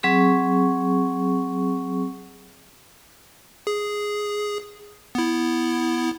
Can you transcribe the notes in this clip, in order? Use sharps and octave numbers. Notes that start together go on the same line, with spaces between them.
F#3 C4 G#4 C#6
G#4
B3 E4